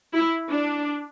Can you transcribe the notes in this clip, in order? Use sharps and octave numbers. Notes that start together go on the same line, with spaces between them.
E4
D4